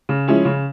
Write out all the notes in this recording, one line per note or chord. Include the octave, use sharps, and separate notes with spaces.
C#3
F3 G#3 C#4 E4
C#3